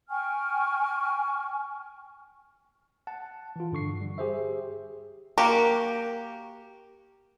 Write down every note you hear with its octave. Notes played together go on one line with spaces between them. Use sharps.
G5 G#5 C#6 F6
F#5 A5
E3 F4
G2 D3 C#6 C7
G3
G4 G#4 C5 E5
A#3 F#4 G4 A#4